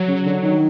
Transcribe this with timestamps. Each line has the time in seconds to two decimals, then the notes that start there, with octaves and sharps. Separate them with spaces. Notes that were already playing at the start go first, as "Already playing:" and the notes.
Already playing: F#3
0.08 C#3
0.26 D3
0.43 D#3